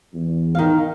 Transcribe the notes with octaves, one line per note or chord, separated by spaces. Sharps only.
E2
D#3 F5